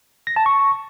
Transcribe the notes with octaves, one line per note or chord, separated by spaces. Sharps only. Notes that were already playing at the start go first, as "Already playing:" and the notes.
A#6
A5
C#6